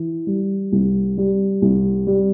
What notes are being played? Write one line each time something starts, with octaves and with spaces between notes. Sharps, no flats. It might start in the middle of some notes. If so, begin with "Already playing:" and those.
Already playing: E3
G3
C2
G3
C2
G3